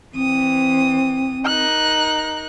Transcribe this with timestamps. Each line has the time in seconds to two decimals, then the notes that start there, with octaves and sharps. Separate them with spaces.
0.14 E3 C4 D#6
1.46 D#4 A#4 F#6